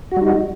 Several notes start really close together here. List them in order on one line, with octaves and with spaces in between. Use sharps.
F#4 G3 D#4